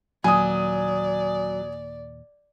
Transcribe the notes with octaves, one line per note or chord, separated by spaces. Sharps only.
D#2 A#2 F#3 D5 G#5 D#6